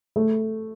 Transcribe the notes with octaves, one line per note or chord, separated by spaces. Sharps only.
A3